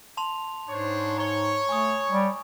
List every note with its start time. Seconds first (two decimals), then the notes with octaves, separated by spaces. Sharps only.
0.17 A5 C6 F7
0.68 G#2 D4 C5 C#5
1.18 C#5 A#5 G7
1.69 A3 G#5 C#6 D#6
2.10 G3